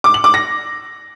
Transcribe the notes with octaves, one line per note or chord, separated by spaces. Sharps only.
D6
F#7
D6
A#6